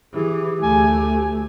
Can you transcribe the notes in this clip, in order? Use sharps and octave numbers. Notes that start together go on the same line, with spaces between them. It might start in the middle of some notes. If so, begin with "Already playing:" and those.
E3 G4 G#4
D2 A3 G#5